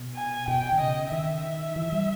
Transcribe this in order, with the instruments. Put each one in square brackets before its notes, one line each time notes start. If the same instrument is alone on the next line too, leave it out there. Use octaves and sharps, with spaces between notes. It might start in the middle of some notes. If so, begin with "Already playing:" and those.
Already playing: [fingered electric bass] B2
[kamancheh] G#5
[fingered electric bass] B2 [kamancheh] G5
[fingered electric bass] D#3
[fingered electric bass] C#3 [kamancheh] D#5
[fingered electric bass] D#3 [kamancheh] E5
[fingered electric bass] E3
G3